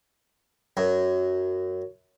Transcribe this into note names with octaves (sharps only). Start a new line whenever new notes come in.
F#2